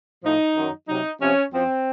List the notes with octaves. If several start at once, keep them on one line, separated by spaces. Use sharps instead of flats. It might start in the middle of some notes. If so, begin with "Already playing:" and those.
A2 F3 D#4
F#2 D#3 F#3
C3 F#3 D#4
C3 F3 C#4
F#2 F3 C4